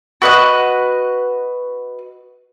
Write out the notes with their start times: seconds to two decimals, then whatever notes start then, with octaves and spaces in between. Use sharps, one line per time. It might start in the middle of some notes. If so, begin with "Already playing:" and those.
0.22 F#4 B4 D#5 F#6